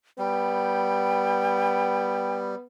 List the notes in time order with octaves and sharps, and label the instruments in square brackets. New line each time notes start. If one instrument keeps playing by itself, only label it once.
[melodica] G3 [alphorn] B3 [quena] G5